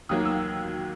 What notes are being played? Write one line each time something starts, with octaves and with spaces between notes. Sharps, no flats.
D#2 D#3 F#3 A#3 D#6
E6